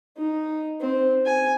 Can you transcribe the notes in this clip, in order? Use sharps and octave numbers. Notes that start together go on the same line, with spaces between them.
D#4
C4
G#5